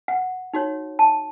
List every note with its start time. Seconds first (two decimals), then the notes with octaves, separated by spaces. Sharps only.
0.08 F#5
0.54 D#4 F#4 C#5
0.99 A5